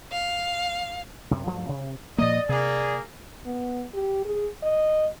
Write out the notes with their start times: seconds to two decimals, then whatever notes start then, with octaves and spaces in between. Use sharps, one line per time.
0.12 F5
1.31 F#2 C3
1.46 G2 F3 F#3 A3
1.69 C3
2.18 A#2 F3 A#3 D5 D#5
2.49 C3 A#3 G#4
3.46 B3
3.93 G4
4.25 G#4
4.63 D#5